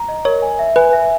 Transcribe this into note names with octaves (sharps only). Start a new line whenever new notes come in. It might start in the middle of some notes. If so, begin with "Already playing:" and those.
Already playing: A#5
D#5
A#4 C#5
G#5
E5
B4 G#5
E5